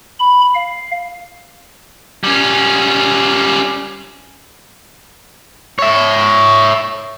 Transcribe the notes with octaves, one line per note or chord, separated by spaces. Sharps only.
B5
F5
G3 C#4
C#5 E5